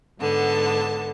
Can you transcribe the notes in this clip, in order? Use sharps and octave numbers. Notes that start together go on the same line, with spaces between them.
G#2 D3 B3 A5